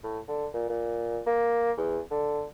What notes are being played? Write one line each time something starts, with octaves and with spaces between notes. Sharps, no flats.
A2
D3
A#2
A#2
A#3
E2
D3